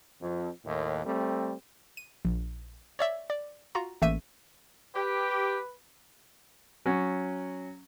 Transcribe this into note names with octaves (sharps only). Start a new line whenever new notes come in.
F2
D#2 A2
G3 A3 C4
D#7
A#1
C#5 D5 E5
D5
F4 F#4 A#5
A1 A3 A#3 E5 E6 D#7
G4 B4
F#3 C#4